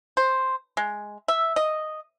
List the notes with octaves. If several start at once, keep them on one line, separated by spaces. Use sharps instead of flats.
C5
G#3
E5
D#5